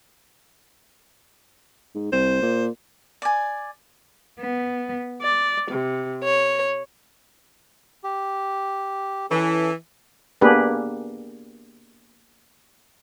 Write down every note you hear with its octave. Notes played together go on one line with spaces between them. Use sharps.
G#2
C2 C5
A#2
D5 G#5
B3
D5
C3
C#5
G4
E3 C#4 A4
A#3 B3 D4 G4 G#4 B4